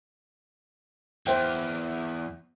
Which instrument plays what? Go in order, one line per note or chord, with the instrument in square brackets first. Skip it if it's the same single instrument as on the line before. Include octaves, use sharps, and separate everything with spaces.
[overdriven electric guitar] E2 [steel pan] C5 E5 G5